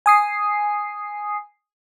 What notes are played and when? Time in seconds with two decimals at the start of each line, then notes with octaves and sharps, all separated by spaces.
0.06 G#5 D#6 C7